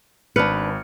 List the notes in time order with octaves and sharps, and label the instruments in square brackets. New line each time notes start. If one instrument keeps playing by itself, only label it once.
[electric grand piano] G#1 F6 C#7 [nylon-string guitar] D4 B4